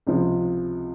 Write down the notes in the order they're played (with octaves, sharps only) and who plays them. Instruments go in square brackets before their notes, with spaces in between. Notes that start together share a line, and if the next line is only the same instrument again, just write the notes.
[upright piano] C#2 C3 F3